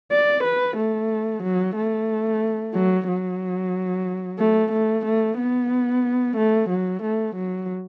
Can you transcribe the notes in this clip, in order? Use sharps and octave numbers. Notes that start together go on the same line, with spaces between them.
D5
B4
A3
F#3
A3
F#3
F#3
A3
A3
A3
B3
A3
F#3
A3
F#3